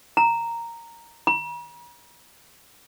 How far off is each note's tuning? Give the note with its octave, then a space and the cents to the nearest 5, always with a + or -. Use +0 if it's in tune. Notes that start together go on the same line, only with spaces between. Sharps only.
A#5 -5
A#5 +45